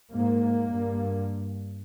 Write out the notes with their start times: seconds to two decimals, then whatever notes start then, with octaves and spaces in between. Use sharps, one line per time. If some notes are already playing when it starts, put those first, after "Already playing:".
0.13 G#2 A#3
0.73 G2